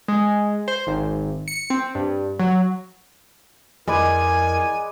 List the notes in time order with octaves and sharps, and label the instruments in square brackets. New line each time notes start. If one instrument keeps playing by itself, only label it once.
[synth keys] G#3
C5
G#1
C#7
C4
G2
F#3
[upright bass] F2 [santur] G#3 B4 D5 [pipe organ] E4 A#4 [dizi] G#5